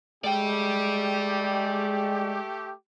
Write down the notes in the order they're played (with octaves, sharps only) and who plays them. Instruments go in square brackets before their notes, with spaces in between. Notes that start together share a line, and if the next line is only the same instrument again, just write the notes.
[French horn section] G#3 [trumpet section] A3 G4 [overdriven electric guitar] D5 G5